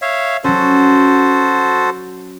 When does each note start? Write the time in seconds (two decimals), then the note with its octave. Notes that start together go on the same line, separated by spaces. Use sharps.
0.02 C#5 E5 F5
0.44 F#3 C#4 F#4 A4 C5